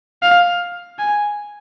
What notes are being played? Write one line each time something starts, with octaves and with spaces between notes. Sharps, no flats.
F5
G#5